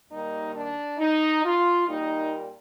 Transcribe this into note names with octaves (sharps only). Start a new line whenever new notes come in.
D#2 D#3 G3 A#3 D#4
D4
D#4
F4
A#2 G3 A#3 D#4